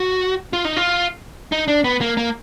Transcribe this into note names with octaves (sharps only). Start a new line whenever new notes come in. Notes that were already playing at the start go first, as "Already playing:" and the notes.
Already playing: F#4
F4
D#4
F4
D#4
D4
B3
A#3
A#3